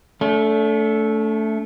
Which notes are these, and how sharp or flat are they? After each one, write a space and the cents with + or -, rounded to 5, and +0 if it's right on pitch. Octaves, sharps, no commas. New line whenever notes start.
A3 +0 D4 -40